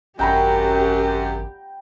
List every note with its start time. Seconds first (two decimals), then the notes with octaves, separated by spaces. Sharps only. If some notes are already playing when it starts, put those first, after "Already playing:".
0.19 G#1 F#2 G4 G5 A#5 B5